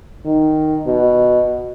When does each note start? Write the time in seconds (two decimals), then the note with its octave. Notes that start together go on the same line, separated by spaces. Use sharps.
0.25 D#3
0.86 B2